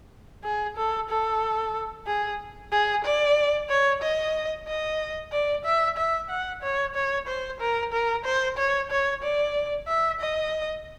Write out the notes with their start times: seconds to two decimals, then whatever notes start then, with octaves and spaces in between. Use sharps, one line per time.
0.44 G#4
0.76 A4
1.09 A4
2.07 G#4
2.72 G#4
3.04 D5
3.69 C#5
4.02 D#5
4.67 D#5
5.32 D5
5.65 E5
5.97 E5
6.30 F#5
6.62 C#5
6.95 C#5
7.27 C5
7.60 A#4
7.92 A#4
8.25 C5
8.57 C#5
8.91 C#5
9.22 D5
9.88 E5
10.20 D#5